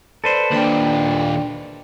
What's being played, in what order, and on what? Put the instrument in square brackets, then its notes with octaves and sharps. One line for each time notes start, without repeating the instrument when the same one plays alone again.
[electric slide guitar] A4 B4 C5 [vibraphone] D5
[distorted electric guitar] D#2 A#2 [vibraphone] D4 D5 G5